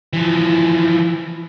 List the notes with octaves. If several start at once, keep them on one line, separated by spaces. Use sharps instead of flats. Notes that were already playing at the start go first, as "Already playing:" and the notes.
E3 F3